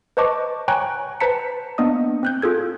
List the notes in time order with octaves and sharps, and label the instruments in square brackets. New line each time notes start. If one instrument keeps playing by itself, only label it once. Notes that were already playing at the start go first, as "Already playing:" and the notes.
[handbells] B4 C5 D#5 A5 C#6 D6
C#5 G5 G#5 A#5 C#6 F#6
B4 C5 A5 A#5 B6 C#7
A#3 B3 D4 D#5 D#6
C4 F#6 G6
F4 G#4 A4 G#6